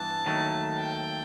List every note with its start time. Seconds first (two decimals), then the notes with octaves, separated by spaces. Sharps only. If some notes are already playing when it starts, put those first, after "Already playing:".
Already playing: G2 E3 B3 A5
0.26 D#2 D#3 F#3 A3
0.80 G5